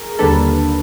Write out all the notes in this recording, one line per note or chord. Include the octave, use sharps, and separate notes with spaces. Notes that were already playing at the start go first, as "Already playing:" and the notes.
Already playing: G#4 A#4
D#2 D3 G3 A#3 D4 A4 B4